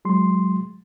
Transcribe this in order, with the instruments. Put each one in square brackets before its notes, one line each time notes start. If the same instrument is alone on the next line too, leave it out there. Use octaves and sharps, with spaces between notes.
[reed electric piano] F#3 G#3 C6